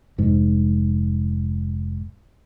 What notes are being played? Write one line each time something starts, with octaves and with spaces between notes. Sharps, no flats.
F1 G#2